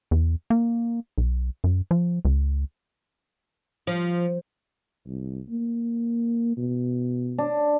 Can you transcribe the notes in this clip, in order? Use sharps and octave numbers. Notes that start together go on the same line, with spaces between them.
E2
A#3
B1
F#2
F3
C#2
F3
C2
A#3
B2
D4